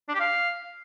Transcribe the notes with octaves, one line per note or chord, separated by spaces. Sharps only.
D4
G4
F5